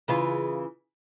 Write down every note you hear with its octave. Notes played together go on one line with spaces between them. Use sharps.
C#3 E3 F4